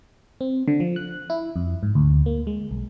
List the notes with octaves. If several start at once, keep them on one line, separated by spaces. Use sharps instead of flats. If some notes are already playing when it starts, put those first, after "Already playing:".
C4
D3
F3
F#6
E4
F2
G#2
D2
A#3
G#3
B1